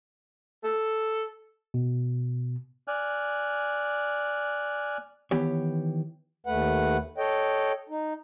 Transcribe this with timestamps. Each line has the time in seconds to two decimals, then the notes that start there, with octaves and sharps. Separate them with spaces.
0.64 A4
1.74 B2
2.88 D5 G#5 F6 F#6
5.31 D#3 E3 B3 G4 C#5
6.47 D#2 A3 B4 F#5
7.18 A4 C#5 D#5 G5
7.89 D#4